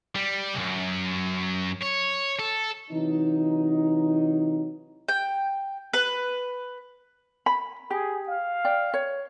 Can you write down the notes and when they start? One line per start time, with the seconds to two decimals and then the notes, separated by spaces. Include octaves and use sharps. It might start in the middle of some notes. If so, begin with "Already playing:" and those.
0.15 G3
0.55 C2 F#2
1.82 C#5
2.39 A4
2.91 C3 E3 F#3 D#4
5.08 G5
5.94 B4
7.46 B5
7.90 G4 G#4
8.28 F5
8.65 D5 G5
8.94 C#5